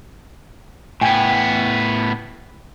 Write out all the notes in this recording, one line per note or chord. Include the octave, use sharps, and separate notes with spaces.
A2 B3 G5 G#5